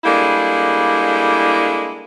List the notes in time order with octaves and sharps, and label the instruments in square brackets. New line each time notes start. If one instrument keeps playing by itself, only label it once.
[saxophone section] G3 G#3 A#3 D4 E4 A4